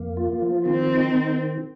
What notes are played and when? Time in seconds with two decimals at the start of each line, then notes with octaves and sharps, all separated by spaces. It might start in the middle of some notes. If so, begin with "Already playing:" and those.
Already playing: F2 A#3
0.17 F4
0.42 F3
0.66 D#3 C4
0.90 D#4
1.14 D#3